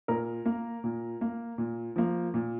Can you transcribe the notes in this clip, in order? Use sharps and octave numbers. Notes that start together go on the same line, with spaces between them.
A#2 A#4
A#3
A#2
A#3
A#2
F3 A#3
A#2